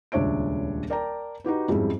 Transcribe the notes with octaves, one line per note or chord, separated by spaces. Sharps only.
D#1 C#2 D4 C#5 E5 D7
A#4 D5 G5 A5 A#5
D#4 F#4 G4 B4
F2 G#2 G3 G#3 C#4 E4